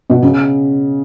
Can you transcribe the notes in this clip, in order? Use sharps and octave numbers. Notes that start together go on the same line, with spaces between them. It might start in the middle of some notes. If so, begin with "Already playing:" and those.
B2
C#3